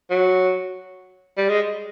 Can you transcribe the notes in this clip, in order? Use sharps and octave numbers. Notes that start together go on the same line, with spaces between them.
F#3
G3
G#3